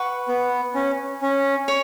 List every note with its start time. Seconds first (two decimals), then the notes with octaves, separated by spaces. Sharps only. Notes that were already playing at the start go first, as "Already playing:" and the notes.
Already playing: B4 F#5 C#6
0.28 B3
0.75 C#4
1.22 C#4
1.68 C#5